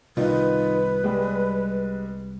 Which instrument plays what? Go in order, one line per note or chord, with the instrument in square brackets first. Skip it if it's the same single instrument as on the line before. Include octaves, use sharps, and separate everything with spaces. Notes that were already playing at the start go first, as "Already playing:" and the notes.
[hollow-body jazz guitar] C2 [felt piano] D#3 D#4 F4 [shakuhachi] B4
[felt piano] G3 G#3